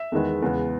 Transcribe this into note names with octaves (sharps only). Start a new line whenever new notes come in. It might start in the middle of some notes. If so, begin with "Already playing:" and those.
Already playing: E5
E2 D#3 G#3 B3
E2 C#3 G#3 B3